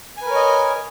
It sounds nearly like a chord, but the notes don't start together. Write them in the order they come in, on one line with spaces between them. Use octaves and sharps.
G#5 B4 A#4 C#5 D#5